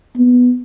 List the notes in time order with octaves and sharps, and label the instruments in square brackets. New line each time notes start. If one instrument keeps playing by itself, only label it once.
[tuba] B3